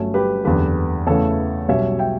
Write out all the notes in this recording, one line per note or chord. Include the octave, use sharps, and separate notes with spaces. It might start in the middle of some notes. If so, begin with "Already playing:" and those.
Already playing: G1 G2 F#3 A3 C#4
G4 B4
F#1 E2 D3 G4 B4
E2 C#3 E3 A3 C#4 A4 C#5
B1 B2 G3 C#4 C#5 E5
E5 G5